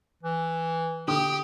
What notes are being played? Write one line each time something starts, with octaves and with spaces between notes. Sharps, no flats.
E3
D3 G4 D#6